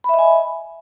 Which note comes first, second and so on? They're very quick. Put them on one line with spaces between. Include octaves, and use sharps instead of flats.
B5 E5 D#5 G#5